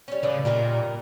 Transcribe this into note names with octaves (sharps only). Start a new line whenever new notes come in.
G3 C#4
A2 C#3 B4 D5
A#2 G3 D#4 A#4